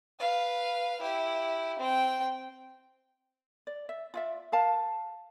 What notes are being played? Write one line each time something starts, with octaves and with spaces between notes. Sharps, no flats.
B4 F5
E4 G4
C4 G5
D5
E5
F4 D5 E5
A#4 F5 A5